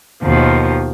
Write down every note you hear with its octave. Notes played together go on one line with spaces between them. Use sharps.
D#2 B2 F3